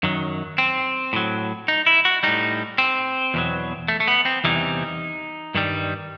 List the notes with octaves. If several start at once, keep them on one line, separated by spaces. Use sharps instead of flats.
F#2 D#3 F#3
C4
A2 F#3
D#4
E4
F#4
A2 G3 D#4
C4
E2 B2 F#3
A3
A3
B3
C4
E2 C3 E3 G3 D#4
G2 D#3 G3